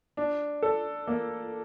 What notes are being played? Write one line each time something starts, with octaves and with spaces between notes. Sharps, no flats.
D4
A4
A#3